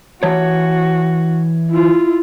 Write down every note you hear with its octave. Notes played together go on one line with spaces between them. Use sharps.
E3 F#4 C#5
E4 F4